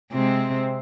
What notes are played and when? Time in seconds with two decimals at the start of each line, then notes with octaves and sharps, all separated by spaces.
0.12 C3 G#3 C4